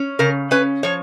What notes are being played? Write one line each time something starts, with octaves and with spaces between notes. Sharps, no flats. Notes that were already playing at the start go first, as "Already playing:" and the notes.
Already playing: C#4
C#3 A#4
C#4 B4
F3 C#5